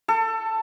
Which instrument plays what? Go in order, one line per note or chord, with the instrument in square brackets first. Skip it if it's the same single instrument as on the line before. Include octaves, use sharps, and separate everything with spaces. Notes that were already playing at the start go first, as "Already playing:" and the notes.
[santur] A4